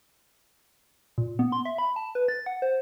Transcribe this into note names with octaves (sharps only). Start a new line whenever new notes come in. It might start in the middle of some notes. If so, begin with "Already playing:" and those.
A#2
B3
C6
E5
B5
A5
B4
A6
F#5
C5